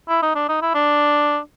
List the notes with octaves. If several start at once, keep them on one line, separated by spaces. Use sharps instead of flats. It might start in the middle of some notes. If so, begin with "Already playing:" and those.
E4
D#4
D4
D#4
E4
D4